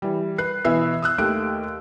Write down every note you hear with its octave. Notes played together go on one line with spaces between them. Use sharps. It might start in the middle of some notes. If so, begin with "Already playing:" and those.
E3 G3
B4 F#6 C7
B2 E3 B3 E5 E6 C7
D#6 E6 F#6
D#2 A3 G4 F#6 D7